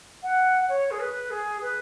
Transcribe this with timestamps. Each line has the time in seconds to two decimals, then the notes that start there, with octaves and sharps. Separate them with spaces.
0.23 F#5
0.68 C#5
0.91 G#4
0.99 B4
1.30 G#4
1.61 B4